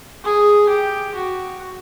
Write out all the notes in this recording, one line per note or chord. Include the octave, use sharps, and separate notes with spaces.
G#4
G4
F#4